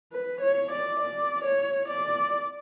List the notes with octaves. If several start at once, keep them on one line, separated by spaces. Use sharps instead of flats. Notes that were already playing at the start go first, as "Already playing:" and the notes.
B4
C#5
D5
D5
C#5
D5